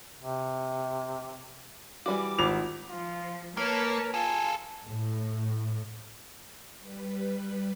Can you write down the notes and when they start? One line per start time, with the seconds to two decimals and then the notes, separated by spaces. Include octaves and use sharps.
0.20 C3
2.06 E3 G3 F#4 D6
2.39 G#1 F4 F7
2.90 F3 F4
3.57 A#3 A#4 B4 C#5 A5
4.14 F4 G#4 A4 G#5
4.85 A2
6.79 G3 B4